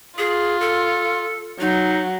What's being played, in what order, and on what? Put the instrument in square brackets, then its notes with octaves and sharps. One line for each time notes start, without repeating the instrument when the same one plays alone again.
[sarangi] F4 [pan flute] G#4
[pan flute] A4
[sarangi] F#3 [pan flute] D#4